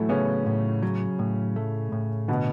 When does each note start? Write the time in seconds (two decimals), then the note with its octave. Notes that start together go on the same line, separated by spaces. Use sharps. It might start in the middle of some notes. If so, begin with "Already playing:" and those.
Already playing: A2 E3 F#3 A3 E4
0.09 C#3 B3 C#4
0.46 A2
0.83 F#3
1.19 A2
1.56 A3
1.92 A2
2.28 B2 D3 B3